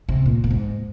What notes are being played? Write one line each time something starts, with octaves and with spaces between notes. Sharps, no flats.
C3
A#2
A#2
G#2